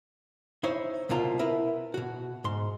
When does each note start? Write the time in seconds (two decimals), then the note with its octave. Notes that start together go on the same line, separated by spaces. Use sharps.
0.63 D#4 E4 C5 C#5 E5
1.09 C2 B2 A#3 F4 A#5
1.39 E4 A#4 B4
1.94 B2 F#4
2.44 G#2 C6